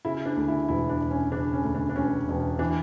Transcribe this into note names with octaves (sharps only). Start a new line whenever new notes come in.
C#3 E4
D4
D2
E4
E1 E4
D4
E1
C#4
C#3 D4
C#4
D2
D4
D4
E1 C#4
E1
E3 D4